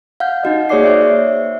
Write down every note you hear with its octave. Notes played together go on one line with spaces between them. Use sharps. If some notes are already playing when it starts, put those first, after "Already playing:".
F5 F#5 F6 G6
D#4 F#4 D#5
A#3 G#4 C#5 D5 D6 C7
C5 E5